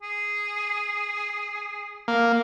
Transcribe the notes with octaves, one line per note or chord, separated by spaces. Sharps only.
G#4
A#3